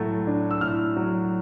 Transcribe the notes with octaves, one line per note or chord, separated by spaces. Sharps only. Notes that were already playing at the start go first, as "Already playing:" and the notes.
Already playing: A2 F#3 A3
D4
E6
A2 F6
F#3